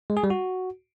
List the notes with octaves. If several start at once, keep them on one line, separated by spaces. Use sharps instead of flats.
G#3
G#4
G3
F#4